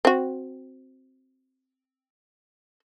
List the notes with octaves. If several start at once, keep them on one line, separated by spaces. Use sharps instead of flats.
C4 F#4